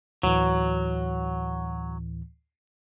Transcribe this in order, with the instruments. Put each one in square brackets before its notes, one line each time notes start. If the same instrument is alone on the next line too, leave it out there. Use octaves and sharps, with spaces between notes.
[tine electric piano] D2 A2 E3 [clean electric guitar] F#3